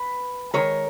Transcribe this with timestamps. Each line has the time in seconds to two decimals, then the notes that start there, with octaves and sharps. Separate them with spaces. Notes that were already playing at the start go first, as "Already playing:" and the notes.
Already playing: B4
0.54 D#3 G#3 A#4 C#5